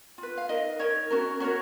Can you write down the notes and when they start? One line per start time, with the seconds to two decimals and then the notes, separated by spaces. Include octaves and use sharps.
0.18 F4
0.23 B4
0.38 F5
0.49 D#4 A#4 D#5
0.79 D#4 A#4 C#5
1.10 C#4 F#4 A#4
1.40 C#4 F#4 A#4 C#5